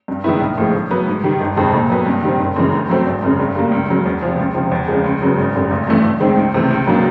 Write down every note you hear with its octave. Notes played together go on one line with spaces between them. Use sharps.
G2
D#3 G#3 B3 E4
A#1
A2 F3 G#3
A2
F#3 B3
G#2
D#3 G3
G1
F2 C3 D#3 G#3
A#2
F#3 B3
G2
D#3 G3 C4
F#1
F#2 C#3 E3 G#3
D2
D3 F#3 A3 C4
G#1
F#2 C#3
G2
D3 G3 A#3
C#2
C#3 F#3
E2
C3 F3
C#2
C3 F3
E2
C#3 F3 G#3
C#2
C#3 F#3 B3
G#1
F#2 D3 G3
A1
G2 E3 A3
A1
G#2 D#3 G#3 C4
C#2
C3 E3 A3 C4
C#2
B2 F#3 A#3 D4